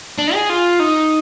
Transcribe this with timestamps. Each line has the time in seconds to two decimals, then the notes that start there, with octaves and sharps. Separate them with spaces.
0.18 D4
0.34 G#4
0.50 F4
0.80 D#4